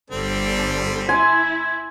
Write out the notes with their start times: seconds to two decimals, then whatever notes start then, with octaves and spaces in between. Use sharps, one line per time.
0.11 G1 D3 G3 C4
1.09 E4 G#5 C6